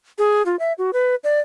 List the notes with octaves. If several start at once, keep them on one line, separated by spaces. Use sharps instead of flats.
G#4
F4
E5
F#4
B4
D5